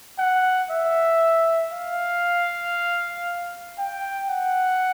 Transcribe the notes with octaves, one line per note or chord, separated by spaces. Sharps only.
F#5
E5
F5
G5
F#5